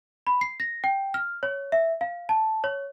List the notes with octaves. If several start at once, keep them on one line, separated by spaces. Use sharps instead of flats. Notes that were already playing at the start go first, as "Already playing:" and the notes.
B5
C7
A#6
G5
F6
C#5
E5
F5
A5
C#5